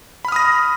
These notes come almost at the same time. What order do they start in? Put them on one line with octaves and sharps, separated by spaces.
B5 F6 D#6 A#6